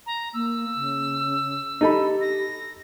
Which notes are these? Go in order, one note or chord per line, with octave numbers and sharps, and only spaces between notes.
A#5
A#3 E6
C#3
D#4 G4 A4 B5
A#6